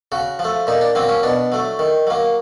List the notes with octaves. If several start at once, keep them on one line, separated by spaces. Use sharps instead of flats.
C#3 F#4
F3
A3
A#2 D#4
D4
F#3 A#3 C4
C#4
B2 D4
F#3 A3
D#3
F#3 A#3